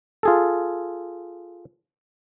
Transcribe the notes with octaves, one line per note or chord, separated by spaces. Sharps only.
F4 G#4 A4